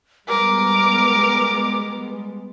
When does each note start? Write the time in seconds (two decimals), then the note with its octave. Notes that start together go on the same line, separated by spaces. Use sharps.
0.28 G3 G#3 B3 A#4 D6